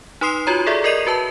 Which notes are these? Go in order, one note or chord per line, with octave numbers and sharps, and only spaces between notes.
D#4 B4 C6 D#6 C7
F4 F#4 C#5 A#5
G#4 A4 D5 E5
A#4 D5 D#5 C7 D#7
F#4 B4 A5